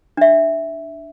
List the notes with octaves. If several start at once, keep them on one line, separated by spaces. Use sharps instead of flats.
D4 E5